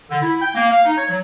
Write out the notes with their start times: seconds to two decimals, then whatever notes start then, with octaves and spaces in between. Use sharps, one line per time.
0.10 D3
0.22 E4
0.41 G5
0.55 A#3
0.70 F5
0.84 D#4
0.97 C#5
1.09 F#3